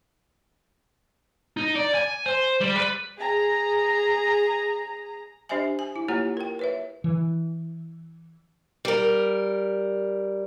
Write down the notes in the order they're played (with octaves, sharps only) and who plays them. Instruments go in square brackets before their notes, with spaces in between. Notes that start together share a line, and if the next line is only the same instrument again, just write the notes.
[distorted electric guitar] D#4
D5
G#5
C5
G3
B4
[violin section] G#4 A#5
[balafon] D4 G4 C5 D#5 E5 G#5
G#5
E4
A#3 F4 G4 C#5 F#5 A#5
A#4 G5
B4 C#5 E5
[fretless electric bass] E3
[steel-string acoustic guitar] G3 A#4